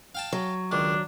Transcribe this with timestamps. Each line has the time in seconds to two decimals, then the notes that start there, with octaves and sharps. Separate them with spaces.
0.15 F5 G5 A5
0.33 F#3
0.71 C#2 D#3 D4